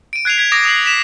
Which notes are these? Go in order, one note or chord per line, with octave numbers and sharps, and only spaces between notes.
D7 D#7
F#6 G#6 C7 D#7 F7
G#6 B6
D6 D#6 A#6 D7
D#6 A#6 C7 F#7
B6 E7